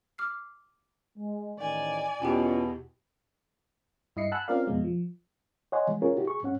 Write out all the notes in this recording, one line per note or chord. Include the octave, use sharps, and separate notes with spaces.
D6 F6 C7
G#3
A1 A2 D#3 D5 G#5
E2 B2 C#4 E4 F4 G4 G5 A5
G2 E4 D#5 C7 C#7
F#5 G#5 A5 B5 E6 F#6
C4 C#4 F4 A#4 D5 F5
F2 B2 G#3
F3
C#5 D#5 F#5 G#5 C6
E3 G#3
C#4 F4 G#4 A#4 C#5
E4 F#4 G4
G#4 C#6
G2 C#4 F#5